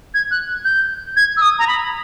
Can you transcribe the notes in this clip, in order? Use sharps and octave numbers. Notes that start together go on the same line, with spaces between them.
G#6
F#6
G6
G#6
E6
D#6
A#5
B5